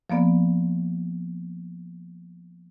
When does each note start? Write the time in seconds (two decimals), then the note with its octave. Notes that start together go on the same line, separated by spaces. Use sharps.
0.10 F3 A#3 B3 D5